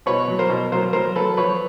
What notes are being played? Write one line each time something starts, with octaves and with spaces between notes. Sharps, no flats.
B2 B4 C#5
F#3
A#4 C5
B2
F#3 A#4 C5
F#3 A#4 C5
F#3 A4 B4
F3 B4 C#5